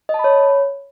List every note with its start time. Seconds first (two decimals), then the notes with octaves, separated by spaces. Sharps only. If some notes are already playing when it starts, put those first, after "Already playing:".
0.09 D#5
0.14 A5
0.19 B5
0.24 C#5